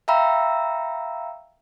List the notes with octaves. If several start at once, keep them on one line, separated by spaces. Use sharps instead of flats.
E5 F5 G5 A#5 B5 E6